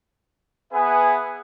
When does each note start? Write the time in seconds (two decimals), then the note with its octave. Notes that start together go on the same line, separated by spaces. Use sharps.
0.73 B3 G#4 B4 E5 F#5 G#5